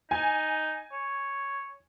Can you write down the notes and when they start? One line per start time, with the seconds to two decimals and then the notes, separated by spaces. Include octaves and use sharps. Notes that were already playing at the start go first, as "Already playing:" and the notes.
0.11 D#4 G#5
0.93 C#5